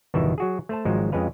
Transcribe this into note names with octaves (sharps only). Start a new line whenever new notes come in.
G1 E2 B2 D#3 E3 E5
F#3 F#4 G#4
A3 C5 A5
G#1 F3 F#3 G#3 D#4 C5
F2 G#3 C#4 B4 F5